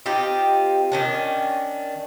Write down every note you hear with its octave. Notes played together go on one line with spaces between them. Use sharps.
C4 D#4 F4 G4
D#3 C#4 D4